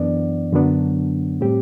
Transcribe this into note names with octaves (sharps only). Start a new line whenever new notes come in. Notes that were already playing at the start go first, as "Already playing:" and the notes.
Already playing: F#2 E3 B3 D4 D5
F#2 D3 F#3 B3 D4
A2 G3 C4 G4